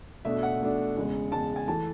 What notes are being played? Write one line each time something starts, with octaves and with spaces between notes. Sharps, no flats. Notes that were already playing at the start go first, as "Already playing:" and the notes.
B2 A3 D4 E5
F#5
B2 A3 D4
E2 C#3 G#3
E2 C#3 G#3 A5
G#5
E3 A3 A5